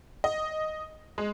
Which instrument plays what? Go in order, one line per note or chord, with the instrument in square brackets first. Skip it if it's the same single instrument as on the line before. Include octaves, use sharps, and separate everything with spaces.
[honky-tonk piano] D#5
G#3